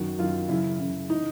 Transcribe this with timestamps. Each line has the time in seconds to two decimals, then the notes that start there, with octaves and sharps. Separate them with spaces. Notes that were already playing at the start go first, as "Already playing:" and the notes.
Already playing: F#2 D#3 F#4
0.19 F#2 D#3 F4
0.49 F#2 C#3 E3 E4
0.79 F#2 C#3 E3
1.10 E3 D#4